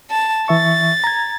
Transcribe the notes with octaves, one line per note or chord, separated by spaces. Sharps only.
A5
E3 E5 C#6 A6
A#5 G#6